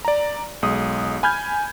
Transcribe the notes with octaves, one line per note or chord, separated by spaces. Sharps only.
D5 A#5
B1 G#3 D#6
G#5 B5 F6 G6 G#6